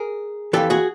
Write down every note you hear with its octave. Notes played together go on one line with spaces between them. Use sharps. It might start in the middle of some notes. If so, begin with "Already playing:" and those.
Already playing: G#4 A#4
F2 C#3 E3 G4 A4
F#4 G#4